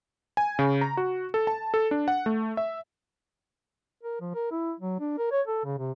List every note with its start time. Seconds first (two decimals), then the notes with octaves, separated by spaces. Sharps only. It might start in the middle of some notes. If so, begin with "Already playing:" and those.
0.37 G#5
0.59 C#3
0.81 A#5
0.97 F#4
1.34 A4
1.47 A5
1.74 A4
1.91 D4
2.08 F#5
2.26 A3
2.57 E5
4.03 A#4
4.21 F3
4.34 A#4
4.51 E4
4.80 F#3
5.00 D4
5.18 A#4
5.31 C#5
5.47 A4
5.65 C#3
5.78 C3